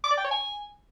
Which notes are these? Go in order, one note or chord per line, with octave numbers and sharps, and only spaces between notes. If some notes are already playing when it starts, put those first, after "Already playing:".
D6
D5
G5
C#5
G#5